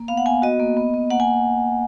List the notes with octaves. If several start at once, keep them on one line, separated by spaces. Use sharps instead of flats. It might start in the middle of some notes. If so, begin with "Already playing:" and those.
Already playing: A#3
B3 F5
F#5
B3 G#5
F#4 D#5
A#3
B3
B3
A#3 F#5
G#5